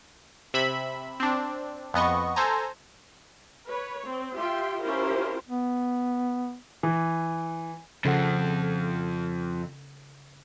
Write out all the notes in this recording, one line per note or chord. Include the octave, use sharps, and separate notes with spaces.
C3 E5 B5
C4 D4
F2 B3 D#5 C#6
A4 C5 G#5 A#5
B4 C#5
C4
F4 G4 E5 G5 C6
C#4 E4 F4 G4 A#4 C5
B3
E3
F2 C#3 F3 A4 F#5